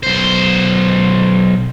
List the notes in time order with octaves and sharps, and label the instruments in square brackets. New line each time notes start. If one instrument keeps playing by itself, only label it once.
[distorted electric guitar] B1 C5